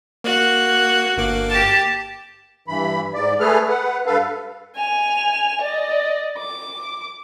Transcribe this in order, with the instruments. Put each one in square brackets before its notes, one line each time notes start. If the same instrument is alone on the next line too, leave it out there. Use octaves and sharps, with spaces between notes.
[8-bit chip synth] A#3 F#6 [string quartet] F#4
[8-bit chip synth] G1 A#3 D6
[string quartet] G4 A5
[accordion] G2 E3 B5
G#2 D5
A3 G#4 A4 B4 F6
B4 F#5
G2 A4 B4 F5
[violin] G#5 F7
D5 D#5
D6